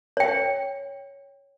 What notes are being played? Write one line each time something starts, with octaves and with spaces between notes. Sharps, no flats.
C#5 G5